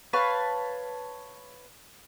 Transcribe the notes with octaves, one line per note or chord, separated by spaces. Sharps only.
B4 C#5 F5 A5